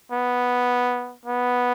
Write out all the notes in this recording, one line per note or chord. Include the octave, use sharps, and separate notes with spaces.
B3
B3